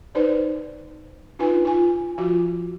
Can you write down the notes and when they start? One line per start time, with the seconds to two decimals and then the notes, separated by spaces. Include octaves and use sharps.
0.15 D#4 B4 C5 D5
1.39 D4 D#4 F4 B4 G#5
1.65 F4 G#5
2.18 F3 F4 F#4